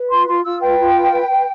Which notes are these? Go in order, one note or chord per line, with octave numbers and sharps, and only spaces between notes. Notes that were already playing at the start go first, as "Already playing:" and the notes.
Already playing: B4
F4 C6
F4 C6
F4 E6
B4 G5
F4
B4
B4
B4